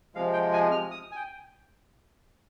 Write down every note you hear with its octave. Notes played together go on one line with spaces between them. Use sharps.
C3 F3 G#3 F5
G5
G#5
F6
D#6
G#5
G5